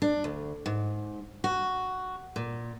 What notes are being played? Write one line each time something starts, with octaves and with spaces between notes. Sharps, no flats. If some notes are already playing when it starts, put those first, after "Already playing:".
D4
D2
G#2
F#4
A#2